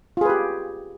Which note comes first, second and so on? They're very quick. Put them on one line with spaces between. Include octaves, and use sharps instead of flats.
F4 G#4 B4 G4